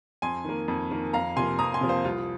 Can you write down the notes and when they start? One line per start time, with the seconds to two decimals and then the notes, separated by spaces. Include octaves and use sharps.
0.22 F2 G#5 C6
0.44 D#3 A#3
0.68 F2
0.91 D#3 A#3
1.13 F2 F5 A#5
1.36 C3 F3 A#3 G#5 C6
1.58 F2 A#5 D#6
1.74 G#5 C6
1.81 C3 F3 A#3
1.89 C5 F5
2.04 C2 F4